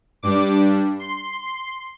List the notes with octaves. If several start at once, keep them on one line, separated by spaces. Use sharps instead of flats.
G2 G3 D4 D6
C6
C6